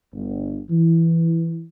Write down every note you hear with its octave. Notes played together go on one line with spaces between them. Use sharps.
G1
E3